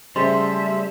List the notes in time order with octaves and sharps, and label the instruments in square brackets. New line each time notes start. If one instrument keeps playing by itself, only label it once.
[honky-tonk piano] C#3 C5 C6 [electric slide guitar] G3 A3 [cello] E5